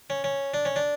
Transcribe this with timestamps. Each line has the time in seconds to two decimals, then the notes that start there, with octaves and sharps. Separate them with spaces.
0.10 C#4
0.24 C#4
0.54 D4
0.65 C#4
0.76 D4